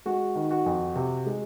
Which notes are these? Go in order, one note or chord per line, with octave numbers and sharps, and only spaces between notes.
G#3 F#4
D#3
F#4
F2
C3
G#3